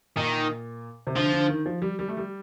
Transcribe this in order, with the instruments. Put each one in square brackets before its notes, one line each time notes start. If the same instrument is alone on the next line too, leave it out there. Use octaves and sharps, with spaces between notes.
[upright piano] A#2 [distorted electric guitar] D#3
[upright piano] C3
[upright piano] D3 [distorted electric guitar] F3
[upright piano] D3
D#3
F3
G3
G3
A3
G3